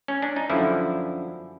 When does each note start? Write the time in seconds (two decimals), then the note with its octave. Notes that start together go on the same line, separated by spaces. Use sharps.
0.08 C#4
0.22 D4
0.36 D#4
0.50 F#2 D3 F3 E4